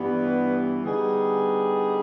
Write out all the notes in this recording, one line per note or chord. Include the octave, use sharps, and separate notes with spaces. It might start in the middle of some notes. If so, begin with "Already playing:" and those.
Already playing: G2 E3 G3 B3
D3 G3 B3 D#4 G#4